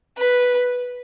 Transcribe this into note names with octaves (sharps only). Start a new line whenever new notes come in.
B4